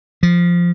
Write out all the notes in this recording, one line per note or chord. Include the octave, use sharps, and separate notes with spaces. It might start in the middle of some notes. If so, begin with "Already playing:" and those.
F3